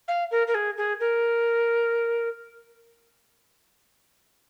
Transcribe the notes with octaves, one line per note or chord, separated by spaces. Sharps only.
F5
A#4
A#4
G#4
G#4
A#4